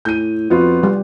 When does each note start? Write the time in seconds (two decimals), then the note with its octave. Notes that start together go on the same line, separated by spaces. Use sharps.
0.05 A2 G6 D#7
0.50 F2 B3 F4 F#4
0.83 G3